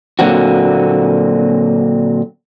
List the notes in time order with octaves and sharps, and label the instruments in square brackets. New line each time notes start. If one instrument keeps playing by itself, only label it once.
[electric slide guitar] A#2 D3 F#3 A#3 C4 F#4